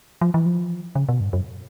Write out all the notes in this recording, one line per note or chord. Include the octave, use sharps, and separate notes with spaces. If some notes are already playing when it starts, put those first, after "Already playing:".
F3
E3
F3
C#3
B2
G2
F#2